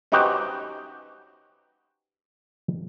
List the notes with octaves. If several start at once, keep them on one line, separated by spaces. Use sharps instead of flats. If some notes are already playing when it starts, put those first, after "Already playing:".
C#4 D#4 F#4 G4 B4 C5